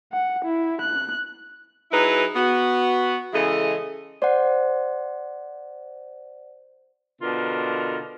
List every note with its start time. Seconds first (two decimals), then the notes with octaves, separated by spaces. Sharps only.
0.13 F#5
0.45 E4
0.81 F#6
1.92 F#3 D#4 E4 G#4 B4
2.34 B3 F#4
3.33 C#3 E3 G#3 E4 A4 D#5
4.22 C5 D5 F#5
7.21 B2 D3 F4 A#4